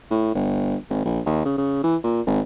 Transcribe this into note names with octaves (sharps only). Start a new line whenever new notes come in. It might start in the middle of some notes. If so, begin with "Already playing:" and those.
A2
G1
G#1
A#1
D#2
C#3
C#3
E3
A#2
G#1